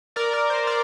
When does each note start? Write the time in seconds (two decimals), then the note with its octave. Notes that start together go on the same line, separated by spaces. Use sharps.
0.16 A#4 D5
0.33 A#4
0.50 C5
0.67 A#4 D5